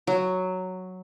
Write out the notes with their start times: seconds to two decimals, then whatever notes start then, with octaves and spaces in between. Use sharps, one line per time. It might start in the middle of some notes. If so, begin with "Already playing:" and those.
0.07 F#3